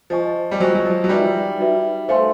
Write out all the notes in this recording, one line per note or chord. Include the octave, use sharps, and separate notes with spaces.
F3 C5 D#5 G#5 C#6
G3
F#3 C5 D#5 G#5 C#6
F#3
F3
F#3
G3 D#4 F#4 B4 E5
D#4 F#4 B4 E5
A3 C5 F5 G#5 C6